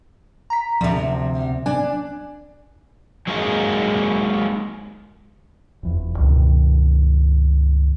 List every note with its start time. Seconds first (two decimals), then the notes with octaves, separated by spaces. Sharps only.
0.50 A#5 B6
0.81 D2 C3 F3
1.66 D4 G#5
3.27 F#3 G#3 A#3 D#4 G#4 D#5
5.83 F1 E2
6.19 C#2 G2 B2 D#3